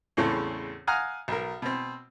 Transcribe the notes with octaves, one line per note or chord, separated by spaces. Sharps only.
E2 A2 C#3 C4 A4
F5 F#5 G#5 A#5 D#6 F6
B1 A#4
B2 C4